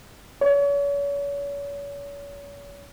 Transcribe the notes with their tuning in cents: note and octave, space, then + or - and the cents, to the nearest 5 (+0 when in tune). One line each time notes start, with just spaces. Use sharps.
C#5 +40